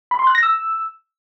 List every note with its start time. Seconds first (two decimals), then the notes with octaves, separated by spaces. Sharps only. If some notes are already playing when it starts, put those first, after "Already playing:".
0.11 B5
0.19 C6
0.27 F#6
0.35 A#6
0.43 E6